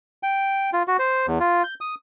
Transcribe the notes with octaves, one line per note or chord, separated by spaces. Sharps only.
G5
F4
F#4
C5
E2
F4
G6
D#6